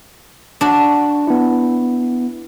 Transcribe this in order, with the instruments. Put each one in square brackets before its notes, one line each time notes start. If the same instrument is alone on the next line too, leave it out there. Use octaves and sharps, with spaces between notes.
[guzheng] D4 F#4
[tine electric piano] B3 E4